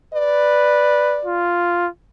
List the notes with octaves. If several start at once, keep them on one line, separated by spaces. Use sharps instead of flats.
B4 D5
F4